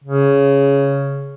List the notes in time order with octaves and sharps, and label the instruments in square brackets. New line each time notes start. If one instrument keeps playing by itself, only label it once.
[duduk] C#3